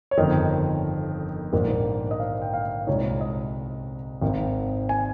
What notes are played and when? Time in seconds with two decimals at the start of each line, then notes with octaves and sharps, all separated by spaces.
0.11 C#5
0.17 G1 F2 D#3 D#5
1.53 A#1 G#2 D#3 A#3
2.11 D#5
2.20 F5
2.42 G5
2.53 F5
2.87 C2 A#2 G#3 D#4 C#5
3.21 D#5
4.22 G#1 G#2 D#3
4.89 G#5